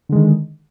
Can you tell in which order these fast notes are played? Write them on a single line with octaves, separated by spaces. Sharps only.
D3 G#3 D#3